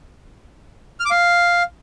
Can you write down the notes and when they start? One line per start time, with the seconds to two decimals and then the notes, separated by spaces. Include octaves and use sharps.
1.00 F6
1.05 D6
1.11 F5